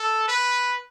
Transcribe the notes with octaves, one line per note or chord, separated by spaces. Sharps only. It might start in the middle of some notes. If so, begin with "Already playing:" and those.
Already playing: A4
B4